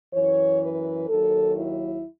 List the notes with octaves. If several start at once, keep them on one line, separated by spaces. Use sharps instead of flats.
F#2 E3 C#5
B4
D#2 D#3 F#3 A4
E4